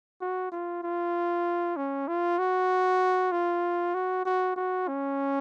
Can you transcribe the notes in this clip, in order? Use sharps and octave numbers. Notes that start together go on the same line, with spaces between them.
F#4
F4
F4
C#4
F4
F#4
F4
F#4
F#4
F#4
C#4